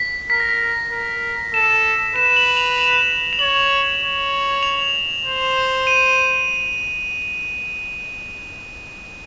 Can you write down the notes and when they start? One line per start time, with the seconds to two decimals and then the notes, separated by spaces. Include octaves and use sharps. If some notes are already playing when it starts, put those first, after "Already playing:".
Already playing: B6
0.30 A#4 B6
0.40 A#6
0.49 B6
0.92 A#4
1.54 A4 E7
2.16 B4 E7
2.36 F#7
2.57 F7
2.78 E7
3.33 F7
3.39 C#5 F#7
4.02 C#5
4.63 F7
5.25 C5
5.87 D#7